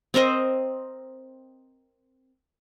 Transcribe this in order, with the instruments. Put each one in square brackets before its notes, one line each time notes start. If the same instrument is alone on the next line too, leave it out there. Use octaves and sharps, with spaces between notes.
[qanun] C4 A#4 C5 D#5